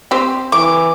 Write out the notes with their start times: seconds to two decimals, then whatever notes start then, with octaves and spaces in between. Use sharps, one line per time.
0.11 C4 G4 C5
0.52 E3 D6